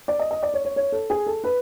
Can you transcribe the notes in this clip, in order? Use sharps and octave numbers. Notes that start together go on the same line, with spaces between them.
D5
D#5
D#5
D5
C#5
C#5
C#5
A4
G#4
A4
B4